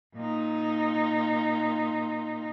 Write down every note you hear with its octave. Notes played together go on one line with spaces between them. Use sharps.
A#2 D#4